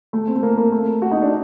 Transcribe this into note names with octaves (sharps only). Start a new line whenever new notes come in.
A3
C4
A3
A#3
A#3
A3
F#4
D#4
D4